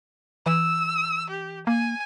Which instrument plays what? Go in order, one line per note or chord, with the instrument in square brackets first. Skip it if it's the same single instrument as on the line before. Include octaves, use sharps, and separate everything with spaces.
[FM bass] E3 [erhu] E6
[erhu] G4
[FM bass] A#3 [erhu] G#5